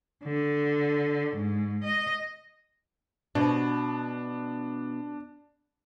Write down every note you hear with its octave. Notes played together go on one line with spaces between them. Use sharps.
D3
G#2
D#5
B2 D4